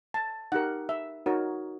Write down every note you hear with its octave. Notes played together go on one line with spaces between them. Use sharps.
A5
D#4 G4 A#4 F#5
E5
D#4 F#4 A#4 C#5